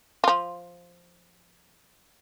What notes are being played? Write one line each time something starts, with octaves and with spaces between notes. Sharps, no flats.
F3 F4